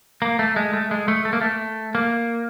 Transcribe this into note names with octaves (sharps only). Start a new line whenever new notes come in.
A#3
A3
G#3
A3
G#3
A3
A3
A#3
A3
A#3